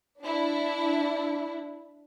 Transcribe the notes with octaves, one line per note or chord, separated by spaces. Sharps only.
D4 E4